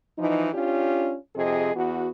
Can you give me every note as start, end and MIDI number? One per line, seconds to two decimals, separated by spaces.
0.18 0.53 52
0.18 0.53 53
0.18 0.53 63
0.53 1.15 61
0.53 1.15 62
0.53 1.15 65
0.53 1.15 67
1.35 1.72 41
1.35 1.72 48
1.35 1.72 68
1.35 1.72 75
1.74 2.09 40
1.74 2.09 59
1.74 2.09 66